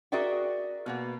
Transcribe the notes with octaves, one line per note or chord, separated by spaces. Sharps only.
F#4 G#4 A#4 D5 E5 G5
B2 A#3 B3